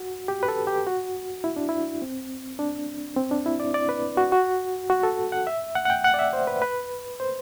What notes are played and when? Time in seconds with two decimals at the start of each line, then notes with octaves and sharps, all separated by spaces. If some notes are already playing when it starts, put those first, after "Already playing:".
Already playing: F#4
0.28 G4
0.43 B4
0.48 A4
0.67 G4
0.87 F#4
1.44 E4
1.56 D4
1.69 E4
2.02 C4
2.59 D4
3.16 C4
3.31 D4
3.46 E4
3.60 D5
3.74 D5
3.89 B4
4.17 F#4
4.32 F#4
4.90 F#4
5.03 A4
5.32 F#5
5.47 E5
5.75 F#5
5.85 F#5
5.90 G5
6.04 F#5
6.14 D5
6.19 E5
6.33 C5
6.47 B4
6.62 B4
7.20 C5